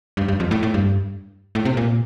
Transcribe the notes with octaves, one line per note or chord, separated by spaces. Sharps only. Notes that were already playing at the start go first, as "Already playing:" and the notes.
G2
G2
F2
A2
A2
G2
A2
C3
A#2